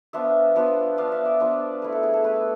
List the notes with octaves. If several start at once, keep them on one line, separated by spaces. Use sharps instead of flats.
F3 B3 D4 F4 E5
F3 B3 D4 F4
F3 B3 D4 F4 F5
E5
D5
F3 B3 D4 F4
A3 E4 B4
A4
G#4
A4
A3 E4 B4